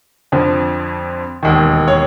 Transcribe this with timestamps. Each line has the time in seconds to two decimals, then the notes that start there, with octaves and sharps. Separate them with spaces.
0.32 F2 D3 F3
1.43 E1 D#2 D#3
1.88 C#5